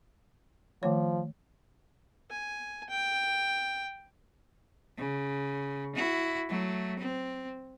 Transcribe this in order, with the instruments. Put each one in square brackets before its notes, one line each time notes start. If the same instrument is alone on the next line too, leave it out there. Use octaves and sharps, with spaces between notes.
[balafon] D#3 A3 C#5 [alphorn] F3
[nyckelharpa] G#5
G5
[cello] C#3
E4 F#4
F#3 A3
C4